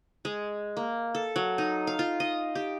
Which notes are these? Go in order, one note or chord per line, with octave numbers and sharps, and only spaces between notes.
G#3
A#3
A4
F#3
D#4
F5
F4
D#5
G4